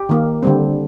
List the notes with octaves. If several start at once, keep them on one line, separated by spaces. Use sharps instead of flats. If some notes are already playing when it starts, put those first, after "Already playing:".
Already playing: G4
D#3 A#3
D3 G3 C4